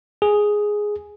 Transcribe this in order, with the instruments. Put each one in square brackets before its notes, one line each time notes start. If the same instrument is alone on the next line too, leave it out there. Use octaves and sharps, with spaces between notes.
[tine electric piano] G#4